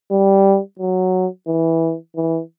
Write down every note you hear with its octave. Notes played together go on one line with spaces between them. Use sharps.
G3
F#3
E3
E3